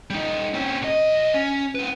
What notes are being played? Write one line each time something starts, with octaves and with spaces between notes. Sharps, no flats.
G3 D#4
C4 C#4
B1 D#5
C#4
C4 B4